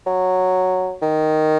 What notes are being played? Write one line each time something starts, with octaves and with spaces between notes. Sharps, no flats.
F#3
D#3